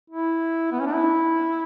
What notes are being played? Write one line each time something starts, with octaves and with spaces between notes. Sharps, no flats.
E4
B3
C#4
D4
E4